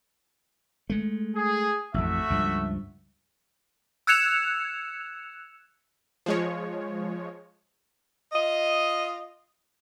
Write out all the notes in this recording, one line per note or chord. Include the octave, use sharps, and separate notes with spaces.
G#3 A3
G#4
A1 F2 A3 F#4 E5
C#2 G2 F3
E6 F#6 G#6 C#7 E7 F7
F3 G#3 C#5
F4 D#5